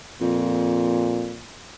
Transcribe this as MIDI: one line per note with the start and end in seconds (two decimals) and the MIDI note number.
0.21 1.34 41
0.21 1.46 46